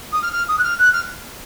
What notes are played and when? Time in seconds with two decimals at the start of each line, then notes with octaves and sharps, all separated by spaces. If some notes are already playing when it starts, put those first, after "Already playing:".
0.13 D#6
0.22 F6
0.33 F6
0.48 D#6
0.58 F#6
0.64 F6
0.79 F#6
0.93 F6